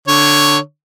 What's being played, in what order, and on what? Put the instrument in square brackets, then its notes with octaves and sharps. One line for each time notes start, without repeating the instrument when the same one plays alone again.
[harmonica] D3 C#5